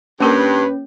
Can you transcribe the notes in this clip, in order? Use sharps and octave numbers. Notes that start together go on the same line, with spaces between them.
G2 A#3 C#4 G4 A#4 B4